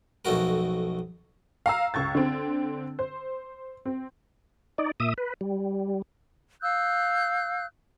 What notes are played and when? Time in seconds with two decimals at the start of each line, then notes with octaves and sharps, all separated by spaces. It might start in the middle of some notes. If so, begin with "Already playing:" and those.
0.25 B1 F2 A3 F#4 A#4
1.66 F5 A#5 E6
1.94 C#2 C#6 G#6 A6
2.15 D3 C4
2.99 C5
3.86 C4
4.78 D#4 D5
5.00 A#2 E5 D#6
5.18 B4
5.41 G3
6.61 F5 E6 F#6 G6